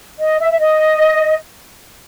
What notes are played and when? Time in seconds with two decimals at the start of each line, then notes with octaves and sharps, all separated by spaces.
0.20 D#5
0.40 E5
0.51 E5
0.60 D#5